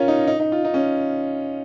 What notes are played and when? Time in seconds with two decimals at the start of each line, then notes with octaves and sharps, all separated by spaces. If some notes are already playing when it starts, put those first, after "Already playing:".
Already playing: C#4 F4 A#4 C#5
0.08 D#4
0.27 D#4
0.40 D#4
0.52 F4
0.65 D#4
0.74 C#4